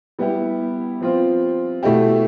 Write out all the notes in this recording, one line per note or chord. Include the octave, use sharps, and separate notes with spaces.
G3 B3 E4 G4
F3 C4 F4
B2 A3 E4 G4